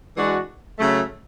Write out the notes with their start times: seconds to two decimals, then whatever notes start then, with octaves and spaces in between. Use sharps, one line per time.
0.15 E3 G#3 D4 F#4
0.78 C#3 F#3 A3